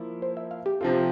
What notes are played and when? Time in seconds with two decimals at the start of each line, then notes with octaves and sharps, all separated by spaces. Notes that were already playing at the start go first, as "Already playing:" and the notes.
Already playing: F3 A#3 E4
0.22 C5
0.37 E5
0.51 F5
0.66 G4
0.81 C3 F3 C4 F4 A4
0.91 G4